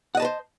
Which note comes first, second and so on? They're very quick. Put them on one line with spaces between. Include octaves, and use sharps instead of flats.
F#5 D#5 A5 B4 C5